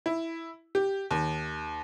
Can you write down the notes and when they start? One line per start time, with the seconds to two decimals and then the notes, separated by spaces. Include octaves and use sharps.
0.06 E4
0.75 G4
1.11 D#2